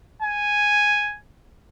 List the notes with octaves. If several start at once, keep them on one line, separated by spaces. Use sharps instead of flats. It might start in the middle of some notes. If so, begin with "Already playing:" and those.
G#5